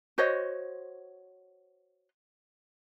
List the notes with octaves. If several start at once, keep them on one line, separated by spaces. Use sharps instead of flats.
F#4 C5 C#5 D#5